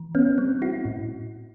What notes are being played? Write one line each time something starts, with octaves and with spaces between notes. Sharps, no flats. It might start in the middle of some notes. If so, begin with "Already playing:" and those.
Already playing: E3
B3 C#4
G3 C4
E4 F#4
A2